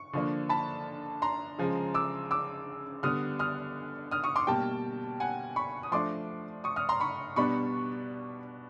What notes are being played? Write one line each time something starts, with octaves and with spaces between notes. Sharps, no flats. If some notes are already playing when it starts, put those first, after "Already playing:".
Already playing: C#6
D3 F3 A#3 D4
A5 B5
A#5 C6
C#3 F3 G#3
D6 E6
D6 E6
D3 G3 B3 D#6 F6
D#6 F6
D#6 F6
C#6 D#6
C6 D6
B2 G3 A#3 G5 A5
F#5 G#5
B5 C#6
D#6
F3 A3 D4 C6 D6
C#6 D#6
D#6 F6
A#5 C6
B5 C#6
B2 G3 B3 D4 B5 C#6